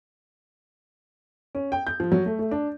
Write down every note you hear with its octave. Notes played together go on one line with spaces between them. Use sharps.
C#4
G5
G6
F3
F#3
A3
A3
D4